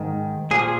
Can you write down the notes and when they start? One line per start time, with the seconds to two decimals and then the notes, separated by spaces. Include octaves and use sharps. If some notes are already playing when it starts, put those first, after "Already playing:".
Already playing: G#2 D#3
0.51 A#2 F3 G#4